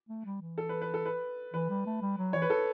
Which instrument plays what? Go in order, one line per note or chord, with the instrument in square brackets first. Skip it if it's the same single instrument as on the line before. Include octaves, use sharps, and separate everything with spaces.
[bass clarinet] A3
G3
E3
[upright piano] A4
B4
B4
A4
B4
[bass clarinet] E3 [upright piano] B4
[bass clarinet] G3
A3
G3
F#3
[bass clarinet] E3 [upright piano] C#5
[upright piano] B4
A4